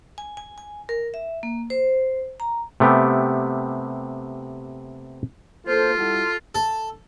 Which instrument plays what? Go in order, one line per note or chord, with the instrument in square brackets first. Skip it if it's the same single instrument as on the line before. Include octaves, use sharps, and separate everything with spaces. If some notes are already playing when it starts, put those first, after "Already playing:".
[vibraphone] G#5
G#5
G#5
A#4
E5
A#3
C5
A#5
[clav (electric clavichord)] C3 A3 B3 G4
[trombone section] A#3 A4 [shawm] F4 [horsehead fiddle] C5
[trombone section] G3 E4 F#4 [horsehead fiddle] A4
[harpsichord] A4